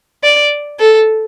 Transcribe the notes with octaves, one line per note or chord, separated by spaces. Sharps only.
D5
A4